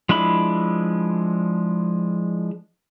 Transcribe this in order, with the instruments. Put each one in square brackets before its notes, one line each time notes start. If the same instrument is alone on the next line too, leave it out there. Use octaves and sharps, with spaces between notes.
[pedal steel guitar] F3 G#3 D4 E4 B5